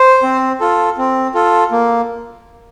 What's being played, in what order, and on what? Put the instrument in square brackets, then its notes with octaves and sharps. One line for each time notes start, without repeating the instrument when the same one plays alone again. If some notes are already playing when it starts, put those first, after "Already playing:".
Already playing: [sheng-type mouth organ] C5
C4
F4 A4
C4
F4 A4
A#3